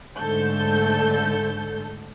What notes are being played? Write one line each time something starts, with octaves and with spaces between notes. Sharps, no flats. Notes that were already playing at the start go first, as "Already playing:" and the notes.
G#2 D3 A3 A4 G6